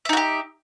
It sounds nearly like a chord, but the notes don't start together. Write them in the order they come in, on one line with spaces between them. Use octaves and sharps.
E5 D#4 F#4 G4